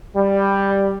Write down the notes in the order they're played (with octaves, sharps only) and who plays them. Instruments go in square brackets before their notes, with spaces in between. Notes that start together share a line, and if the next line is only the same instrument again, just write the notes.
[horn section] G3